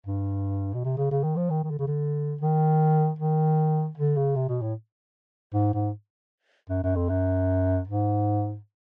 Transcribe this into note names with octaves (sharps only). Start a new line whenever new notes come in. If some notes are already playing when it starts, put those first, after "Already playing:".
G2
B2
C3
C#3
C#3
D#3
F3
D#3
D#3
D3
C#3
D3
D#3
D#3
D3
C#3
C3
B2
A2
G#2
G#2
F#2
F#2
F2
F#2
G#2